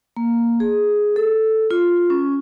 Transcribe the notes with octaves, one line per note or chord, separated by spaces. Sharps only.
A#3
G#4
A4
F4
C#4